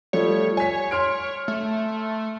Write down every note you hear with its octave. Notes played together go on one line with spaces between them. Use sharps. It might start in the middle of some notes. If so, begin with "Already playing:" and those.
F3 G3 A3 C#5
C#5 G#5 B6
C6 F6 D7
A3